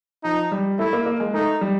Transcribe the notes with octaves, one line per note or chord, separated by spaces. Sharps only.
F3 D#4
G3
A3 E4
A#3
A#3
G#3
A3 D#4
G3